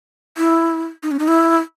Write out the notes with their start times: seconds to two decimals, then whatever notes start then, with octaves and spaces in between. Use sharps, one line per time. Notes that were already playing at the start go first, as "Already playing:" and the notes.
0.37 E4
1.03 D#4
1.11 C#4
1.19 D#4
1.28 E4